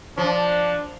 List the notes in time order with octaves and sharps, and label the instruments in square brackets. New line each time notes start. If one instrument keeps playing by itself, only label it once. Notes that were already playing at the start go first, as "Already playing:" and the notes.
[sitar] F3 [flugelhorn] D4